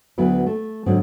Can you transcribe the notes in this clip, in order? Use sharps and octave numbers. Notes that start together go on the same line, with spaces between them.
D2 F#3 B3 E4 B4
A3
G#2 D3 F#3 C4 F#4